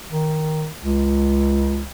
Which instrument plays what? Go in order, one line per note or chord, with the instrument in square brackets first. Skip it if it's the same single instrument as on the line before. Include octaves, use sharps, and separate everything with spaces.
[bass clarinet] D#3
C#2